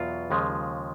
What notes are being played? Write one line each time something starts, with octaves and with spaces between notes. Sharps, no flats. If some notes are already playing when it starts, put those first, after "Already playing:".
Already playing: E2 B2 F#3 F4
D#2 C#3 F3 G#3